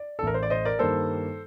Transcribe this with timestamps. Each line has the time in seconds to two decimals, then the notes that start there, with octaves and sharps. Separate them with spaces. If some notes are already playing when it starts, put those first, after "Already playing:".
Already playing: D5
0.19 A4
0.22 A1 A2 A3 A#4
0.34 C5
0.43 D5
0.50 C5 D#5
0.65 A#4 D5
0.79 G2 D#3 G3 A#3 A4 C5